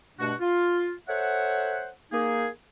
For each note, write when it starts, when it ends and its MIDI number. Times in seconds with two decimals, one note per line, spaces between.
0.18 0.33 43
0.18 0.33 47
0.18 0.33 57
0.18 0.33 62
0.18 0.33 66
0.41 0.92 65
1.08 1.89 69
1.08 1.89 72
1.08 1.89 73
1.08 1.89 76
1.08 1.89 78
2.12 2.47 58
2.12 2.47 63
2.12 2.47 68